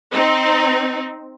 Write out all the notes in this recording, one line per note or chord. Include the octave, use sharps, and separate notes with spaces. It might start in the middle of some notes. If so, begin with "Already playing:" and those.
C4 D#4